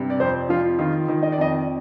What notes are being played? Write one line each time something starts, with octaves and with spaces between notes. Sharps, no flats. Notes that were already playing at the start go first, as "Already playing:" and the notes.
Already playing: G2 C3
D5
F2 C5
F3 F4
D#3 F4
D#3
D#5
D5
F2 D#5